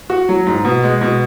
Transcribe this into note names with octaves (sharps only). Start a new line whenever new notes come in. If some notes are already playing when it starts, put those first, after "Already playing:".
F#4
F#3
G#2
B2
G#3
B2